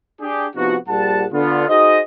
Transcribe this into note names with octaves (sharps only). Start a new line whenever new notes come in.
D4 G4 G#4
C3 F3 B3 D#4 F#4
A#1 G3 F#5 A5
D3 B3 F4
D#4 F#4 G#4 C5 D#5